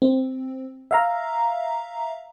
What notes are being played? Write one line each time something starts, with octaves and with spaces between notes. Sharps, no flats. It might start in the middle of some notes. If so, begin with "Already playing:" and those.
C4
E5 F5 A#5